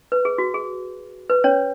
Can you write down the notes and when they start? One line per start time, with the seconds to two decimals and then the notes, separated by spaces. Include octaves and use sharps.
0.12 B4
0.25 G#4
0.38 F#4
0.54 G#4
1.30 B4
1.44 C#4 C#5